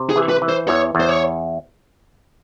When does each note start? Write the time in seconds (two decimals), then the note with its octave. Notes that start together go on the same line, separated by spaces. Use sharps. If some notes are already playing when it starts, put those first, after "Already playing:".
Already playing: C3
0.10 G#4
0.16 E3
0.29 B4
0.42 E3
0.49 C5
0.68 E2 C#5
0.95 E2
1.00 C5
1.09 C#5